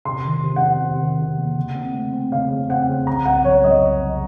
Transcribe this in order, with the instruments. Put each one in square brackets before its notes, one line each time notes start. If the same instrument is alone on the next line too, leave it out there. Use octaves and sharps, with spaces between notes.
[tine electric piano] C3 [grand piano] C6
[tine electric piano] D#3
C3
[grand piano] F#5
[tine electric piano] C3
C3
D#3
C3
A#3
C#3
C4
A3
C4
[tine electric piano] C#3 [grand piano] F5
[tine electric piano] C#3
[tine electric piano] C4 [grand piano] F#5
[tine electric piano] C#3
[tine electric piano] C2 [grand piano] A#5
[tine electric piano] C2 [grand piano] F#5
[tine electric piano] F#3 [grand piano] C#5
[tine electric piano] C2 [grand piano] D#5
[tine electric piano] C2
C2